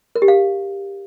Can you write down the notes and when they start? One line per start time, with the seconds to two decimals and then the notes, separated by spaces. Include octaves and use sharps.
0.15 A#4
0.22 G4
0.28 F5